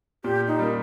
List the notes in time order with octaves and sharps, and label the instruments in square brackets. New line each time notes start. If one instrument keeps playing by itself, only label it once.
[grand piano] A#2 [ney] G4
[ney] D#4
[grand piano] G3 A#3